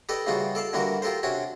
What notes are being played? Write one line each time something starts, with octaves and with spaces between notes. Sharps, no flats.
G4 A4 B4 D5 D#5
C#3 E3 G3 D#4 F4 F#4
A4 D5 F5 A5
D3 E3 G3 A#3 F#4 A#4
F4 G4 A4 A#4 C5
C3 C#4 D4 F#4